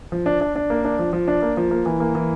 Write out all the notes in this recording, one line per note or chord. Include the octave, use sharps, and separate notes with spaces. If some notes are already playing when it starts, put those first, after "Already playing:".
F3
D4
D4
D4
A#3
D4
F3
F3
D4
A#3
F3
A#3
E3
A#3
E3